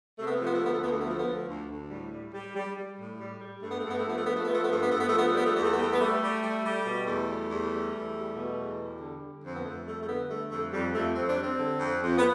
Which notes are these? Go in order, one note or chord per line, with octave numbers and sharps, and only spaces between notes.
C3 A3
B3
F3 A3
B3
A3
D2 B3
A3
D2 B3
A3
F3 B3
A3
B3
D2 A3
D2
D2
A2 G3
G3
G3
G3
G3
A2
G3
G3
G2 A3
B3
G2 A3
B3
A3
F3 B3
A3
F3 B3
A3
F3 B3
A3
B3
G2 A3
B3
G2 A3
B3
F3 A3
B3
A3
G3 B3
A3
E2 B3
A3
G3 B3
A3
B3
G3 A3
G3
G3
G3
B2
E2 A3
G3
E2
G3
E2
G3
B2
E2
G3
D3
D3
F2 C4
B3
F2 A3
G3 A3
A3
D3 B3
G3 A3
F2 A3
F2 G3
F2 A3
F2 C4
D4
G3
C4
D3
F2
F2
B3